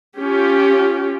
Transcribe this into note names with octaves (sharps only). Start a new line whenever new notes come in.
C#4 F4 G4